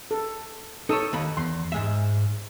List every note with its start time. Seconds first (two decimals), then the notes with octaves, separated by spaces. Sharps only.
0.11 A4
0.89 D#4 A4 C#5 D#6 E6
1.13 D#2 A#3 B5
1.37 E2 C6
1.72 G#2 G#3 E5